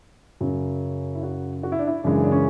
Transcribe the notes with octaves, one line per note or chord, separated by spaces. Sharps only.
F#2 C#3 F#3
E4
F#4
F#4
E4
D4
E4
F#2 C#3 E3 G#3 D4
D4
C#4